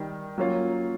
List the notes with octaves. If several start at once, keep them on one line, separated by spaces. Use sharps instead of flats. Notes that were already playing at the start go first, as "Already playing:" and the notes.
Already playing: D#3 G3 D#4
F#3 A#3 C#4 F4